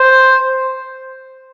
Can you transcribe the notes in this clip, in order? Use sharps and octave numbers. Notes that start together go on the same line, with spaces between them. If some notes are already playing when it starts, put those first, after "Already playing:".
Already playing: C5